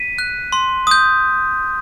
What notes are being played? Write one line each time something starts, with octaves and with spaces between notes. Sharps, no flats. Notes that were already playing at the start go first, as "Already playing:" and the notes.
Already playing: B6 D#7
F#6
C6
D#6 G6